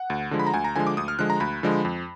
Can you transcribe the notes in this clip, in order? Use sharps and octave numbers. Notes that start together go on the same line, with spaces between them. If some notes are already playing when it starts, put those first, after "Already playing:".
Already playing: F#5
D2
D3 F3 G#3
B5
A#5
D2 G#5
A#5
D3 F3 G#3 G#5
D6
D2 D#6
F6
D3 F3 G#3 F#6
A#5
D2 B5
D3 F3 G#3
F2